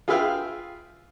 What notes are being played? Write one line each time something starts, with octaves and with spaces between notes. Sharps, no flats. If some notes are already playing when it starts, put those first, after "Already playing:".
F4 G#4 B4 E5 F5 G5